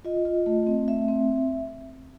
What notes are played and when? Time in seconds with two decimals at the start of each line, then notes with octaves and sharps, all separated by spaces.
0.05 F4 D#5
0.25 F4
0.46 A3
0.67 C4
0.88 A3 E5
1.08 C4